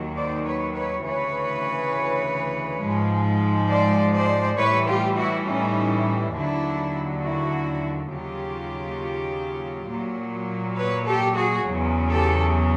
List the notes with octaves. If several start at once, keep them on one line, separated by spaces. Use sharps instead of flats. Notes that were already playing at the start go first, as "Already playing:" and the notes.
Already playing: D#2 D#3 F#3
C5 D5
B4 C#5
B4 C#5
D2 C#3 E3 B4 C#5
G#2 F3 G#3
C5 D5
C5 D5
A2 E3 G3 B4 C#5
F4 G4
E4 F#4
C#4 D#4
D#2 D3 F#3 D4 E4
E4 F#4
D#2 C#3 F#3 F4 G4
A#2 F#3
B4 C#5
G4 A4
F#4 G#4
E2 C#3 F#3
G4 A4